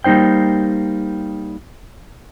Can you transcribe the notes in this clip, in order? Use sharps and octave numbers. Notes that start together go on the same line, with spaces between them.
G3 A#3 D#4 C5 G5